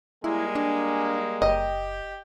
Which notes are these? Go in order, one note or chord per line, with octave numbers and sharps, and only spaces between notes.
G3 G#3 A#3 E4 G#5
D4
F#1 G4 D#5 G5